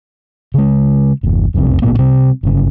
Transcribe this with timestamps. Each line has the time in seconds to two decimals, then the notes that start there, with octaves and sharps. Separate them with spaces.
0.54 C#3 G#3
1.23 G1 E2
1.54 E1 B1 F2 C3
1.82 A1 A#2 A#3 B3
1.99 C3 G3 C4
2.43 G1 C#3